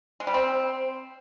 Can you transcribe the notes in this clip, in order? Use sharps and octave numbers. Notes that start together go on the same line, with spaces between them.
G#3
G3
C4